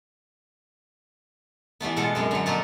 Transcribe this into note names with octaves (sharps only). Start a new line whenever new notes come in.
E3 G3 A3 B3
B2 G#3 F4 A4 F#5
F#2 G#3 C4
D3 F#3
A#2 F3 A3 A#3 A4 D#5